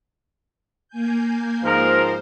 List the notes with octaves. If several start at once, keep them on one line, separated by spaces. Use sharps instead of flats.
A#3 G#5 G6
G#2 F3 A#4 C5